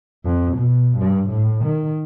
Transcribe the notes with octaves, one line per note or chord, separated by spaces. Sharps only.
F2
B2
G2
A2
D#3